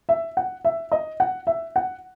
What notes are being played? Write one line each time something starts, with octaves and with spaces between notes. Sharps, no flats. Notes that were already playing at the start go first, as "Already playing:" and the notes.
E5
F#5
E5
D#5
F#5
E5
F#5